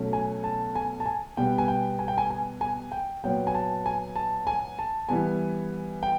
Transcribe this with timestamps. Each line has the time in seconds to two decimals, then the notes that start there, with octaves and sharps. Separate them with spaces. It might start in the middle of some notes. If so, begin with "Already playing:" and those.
Already playing: B2 F#3 A3 C#4
0.13 G#5
0.44 A5
0.76 G#5
1.00 A5
1.06 G#5
1.37 B2 G3 B3 G5
1.58 G#5
1.68 G5
1.99 G#5
2.08 G5
2.18 G#5
2.30 G#5
2.61 G#5
2.92 G5
3.24 A#2 F#3 B3 G5
3.47 G#5
3.55 A5
3.86 G#5
4.16 A5
4.47 G#5
4.79 A5
5.09 E3 G3 B3 G#5
6.03 G5